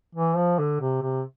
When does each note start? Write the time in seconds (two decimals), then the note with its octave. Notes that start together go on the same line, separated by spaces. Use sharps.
0.15 E3
0.36 F3
0.59 D3
0.81 C3
1.02 C3